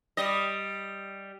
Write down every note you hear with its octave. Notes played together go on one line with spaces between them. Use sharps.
G3 D#5